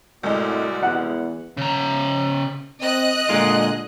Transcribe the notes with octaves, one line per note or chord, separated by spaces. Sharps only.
C2 A2 G#3 F#4 D5
E2 F#5
C#3 A#5
C4 D#5 F#6
A#2 D3 G#3 F4